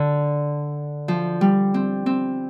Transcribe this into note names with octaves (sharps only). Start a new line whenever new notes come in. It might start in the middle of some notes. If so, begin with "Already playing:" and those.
Already playing: D3
F3
G3
C4
C4